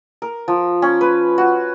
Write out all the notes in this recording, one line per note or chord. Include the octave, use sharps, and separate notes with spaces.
A#4
F3
C#4
B4
F#4